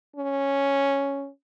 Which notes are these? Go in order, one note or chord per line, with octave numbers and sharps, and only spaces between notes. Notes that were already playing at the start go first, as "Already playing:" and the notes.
C#4